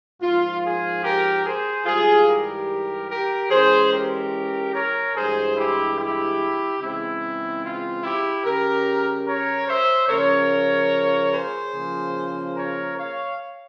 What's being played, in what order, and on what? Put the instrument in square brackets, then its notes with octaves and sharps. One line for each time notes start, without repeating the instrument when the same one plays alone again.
[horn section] G#2 F3 A#3 F4
F4 G#4
G4 A#4
G#4 C5
G#2 E3 G3 F4 G#4
G4 A#4
G4 A#4
E3 G#3 C#4 G#4 C5
G4 A#4
A#4 C#5
G2 E3 G#3 G#4 C5
E4 G4
E4 G4
C#3 E3 G#3 C4 E4
F4
E4 G4
C#3 G3 C#4 G4 A#4
A#4 C#5
C5 E5
C#3 F3 A#3 C#4 A#4 C#5
G#4 C5
C#3 F3 A#3
A#4 C#5
C#5 F5